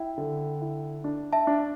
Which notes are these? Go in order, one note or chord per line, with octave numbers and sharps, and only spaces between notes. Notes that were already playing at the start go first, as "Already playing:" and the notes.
Already playing: E4 G5
D3
E4
D4
E5 A5
D4